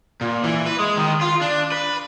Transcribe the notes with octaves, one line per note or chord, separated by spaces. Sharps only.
A#2
E3
B4
G#3
D#3
F4
D4
B4